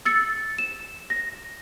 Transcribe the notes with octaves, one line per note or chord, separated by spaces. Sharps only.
E6 A6 C#7
E7
A#6